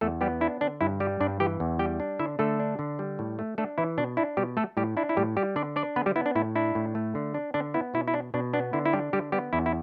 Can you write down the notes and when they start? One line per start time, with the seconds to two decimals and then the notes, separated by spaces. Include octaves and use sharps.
0.01 E2 A3 A4
0.21 G3 B3 G4
0.41 D4 E4
0.61 D3 D4
0.81 G2 E4
1.00 G3 G4
1.20 G2 D4 D5
1.40 E3 G4 G5
1.60 E2
1.79 G3 G4 G5
2.00 D4
2.19 D3 E4 E5
2.39 D3 A3 A4
2.60 D4
2.79 D3
2.99 G3
3.19 A2
3.39 A3
3.58 A3 D4 A4
3.78 E3 E4
3.98 B2 D4
4.17 D4 E4
4.37 B2 G3 G4
4.57 A3 A4
4.77 A2 G3 G4
4.97 D4 E4
5.09 E4
5.17 A2 G3 G4
5.37 G3 G4
5.56 D3 D4 D5
5.76 D4 D5
5.96 D3 B3 B4
6.06 G3 G4
6.16 B3 E4
6.26 D4
6.35 A2 E4
6.56 D4 E4
6.75 A2
6.95 A3
7.15 D3
7.34 D4
7.54 D3 D4
7.74 B3 E4
7.94 B2 E4
8.08 E4
8.14 D4
8.34 B2 D4
8.54 B3 D4
8.73 D3 E4
8.86 E4
8.93 G3 D4 G4
9.13 D3 G3 G4
9.32 G3 B3 G4
9.53 E2 E4
9.66 E4